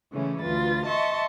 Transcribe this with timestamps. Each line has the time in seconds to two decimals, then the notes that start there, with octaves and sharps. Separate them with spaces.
0.10 C#3 E3 G#3 A3 C#4
0.40 D2 F4 B4 A6
0.84 D#5 E5 A5 C6 C#6